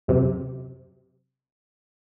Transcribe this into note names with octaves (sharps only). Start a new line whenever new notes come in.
F#2 C3